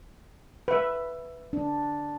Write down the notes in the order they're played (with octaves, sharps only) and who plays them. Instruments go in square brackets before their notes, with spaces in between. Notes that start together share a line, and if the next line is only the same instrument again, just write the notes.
[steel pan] B4 E5
[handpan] D4